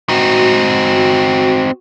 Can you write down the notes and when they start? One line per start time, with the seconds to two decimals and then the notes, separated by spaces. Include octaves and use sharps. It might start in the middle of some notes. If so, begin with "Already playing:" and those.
0.09 C4 D#4 F#4